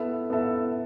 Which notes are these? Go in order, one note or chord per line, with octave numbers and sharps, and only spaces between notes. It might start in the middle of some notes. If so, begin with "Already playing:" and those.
Already playing: B3 E4 A4 E5
B3 E4 A4 E5